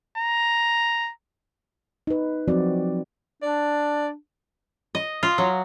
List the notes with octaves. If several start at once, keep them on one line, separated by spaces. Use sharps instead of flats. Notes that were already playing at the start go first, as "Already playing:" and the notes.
A#5
D#4 B4
F3 F#3 C4 F#4 D5
D4 D5
D#5
F4
F#3